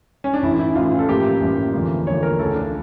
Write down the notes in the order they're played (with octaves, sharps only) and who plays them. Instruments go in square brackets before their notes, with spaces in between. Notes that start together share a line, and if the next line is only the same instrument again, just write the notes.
[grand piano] C#4
D4
A1 A2 E3 E4
E4
A1 A2 E3 F4
A4
A1 A2 F3 A#3 G4
A1 A2 F3 A#3
E2 D3 F3 A#3
E2 D3 F3 A#3 C#5
A#4
C#2 C#3 F3 A3 A4
D4